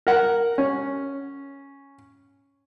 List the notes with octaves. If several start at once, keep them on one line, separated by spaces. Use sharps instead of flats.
A#4 F#5
C#4